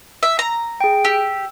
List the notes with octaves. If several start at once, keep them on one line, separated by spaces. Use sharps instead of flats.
E5
A#5
G#4 G5
G4 E6